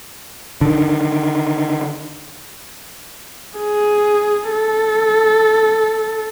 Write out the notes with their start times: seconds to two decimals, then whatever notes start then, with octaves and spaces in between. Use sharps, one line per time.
0.61 D3 D#3
3.59 G#4
4.51 A4